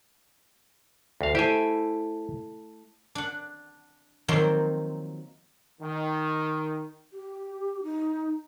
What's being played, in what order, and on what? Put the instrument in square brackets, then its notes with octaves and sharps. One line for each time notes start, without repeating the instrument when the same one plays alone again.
[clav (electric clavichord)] D2 F5
[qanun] A3 E4 [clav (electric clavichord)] G4 C5 G#5
[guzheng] D4 F#5
D#3 F3 F#3 A#3 C4
[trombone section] D#3
[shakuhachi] G4
D#4